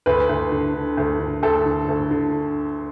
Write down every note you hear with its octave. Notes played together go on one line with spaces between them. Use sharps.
D2 B4
D2
D3
D3
D2
D3
D2 A4
D3
D2
D3